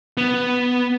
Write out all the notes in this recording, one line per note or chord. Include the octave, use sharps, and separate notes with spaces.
B3